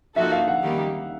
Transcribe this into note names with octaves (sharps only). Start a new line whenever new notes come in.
F3 A#3 D#4 F#4 A4 E5
F5
F#5
D#3 G3 A#3 D#4 G4